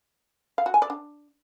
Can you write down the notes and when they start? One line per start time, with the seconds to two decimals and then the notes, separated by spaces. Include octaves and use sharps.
0.58 F5
0.66 F#4
0.74 G#5
0.82 D5
0.90 D4